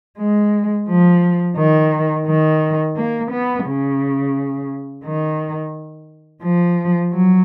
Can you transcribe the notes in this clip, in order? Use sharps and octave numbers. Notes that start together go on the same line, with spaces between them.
G#3
F3
D#3
D#3
A#3
B3
C#3
D#3
F3
F#3